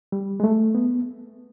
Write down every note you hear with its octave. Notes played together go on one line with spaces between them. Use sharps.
G3
G#3
A3
B3